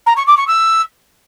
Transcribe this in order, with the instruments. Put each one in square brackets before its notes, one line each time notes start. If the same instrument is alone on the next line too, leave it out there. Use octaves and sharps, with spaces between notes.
[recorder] A#5
C#6
D6
C#6
E6